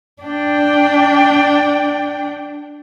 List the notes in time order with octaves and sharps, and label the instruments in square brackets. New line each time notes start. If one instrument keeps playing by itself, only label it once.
[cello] D4 G5